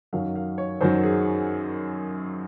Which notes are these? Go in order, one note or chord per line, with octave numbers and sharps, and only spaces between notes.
F#2 D#3 F#3 F5
F5
C#5
F#2 D#3 F#3 C5
G#4